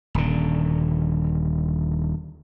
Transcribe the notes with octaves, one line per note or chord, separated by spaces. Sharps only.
D#1 D3